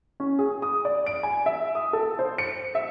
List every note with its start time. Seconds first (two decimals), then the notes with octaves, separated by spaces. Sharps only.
0.20 C#4
0.39 G#4
0.62 D#6
0.85 D5
1.07 D7
1.23 G#5
1.46 E5
1.75 D#6
1.93 A4
2.19 C5
2.38 C#7
2.75 E5